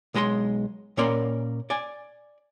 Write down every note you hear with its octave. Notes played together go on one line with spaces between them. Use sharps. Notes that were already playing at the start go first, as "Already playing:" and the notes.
B1 G#3 D#5 A#5 C6
A#2 A#3 C#4 A#4 D5 C6
D5 G#5